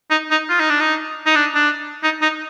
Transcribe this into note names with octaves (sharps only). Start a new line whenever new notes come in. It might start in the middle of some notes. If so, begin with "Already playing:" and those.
D#4
D#4
F4
D#4
D4
D#4
D#4
D4
D4
D#4
D#4